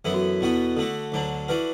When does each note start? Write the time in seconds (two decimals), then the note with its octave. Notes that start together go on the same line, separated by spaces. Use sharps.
0.05 F#2 E3 B3 E4 A4
0.14 F#4
0.23 A4
0.41 E2 B2 B3 F#4
0.76 D3 A3 F#4 A4
1.12 D2 D3 F#3 D4
1.48 E3 D4 F#4 B4